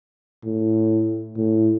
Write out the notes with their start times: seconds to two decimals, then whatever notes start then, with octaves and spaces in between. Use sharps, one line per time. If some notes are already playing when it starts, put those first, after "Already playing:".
0.45 A2
1.37 A2